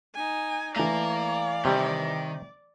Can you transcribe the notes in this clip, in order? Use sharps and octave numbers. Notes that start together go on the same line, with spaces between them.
D#4 G#5
E3 A3 D5 F5 A#5
C3 D#3 G3